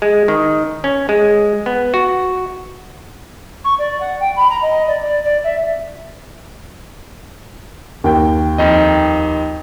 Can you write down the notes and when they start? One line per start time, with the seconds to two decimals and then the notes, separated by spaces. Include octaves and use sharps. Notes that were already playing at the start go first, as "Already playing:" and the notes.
0.02 G#3
0.28 D#3
0.84 C#4
1.09 G#3
1.66 B3
1.94 F#4
3.64 C#6
3.78 D5
4.00 F#5
4.20 G5
4.36 B5
4.50 A#5
4.62 D#5
4.87 D5
5.02 D5
5.24 D5
5.44 E5
8.04 D#2 G5
8.58 F2 D#4 D#5